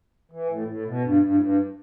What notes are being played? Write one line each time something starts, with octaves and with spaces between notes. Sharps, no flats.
E3
A2
A2
B2
G2
G2
A2
G2